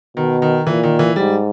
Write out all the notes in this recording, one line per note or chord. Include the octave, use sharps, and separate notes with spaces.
B2 D#3
D#3
A#2 E3
D#3
E3
G#2 G3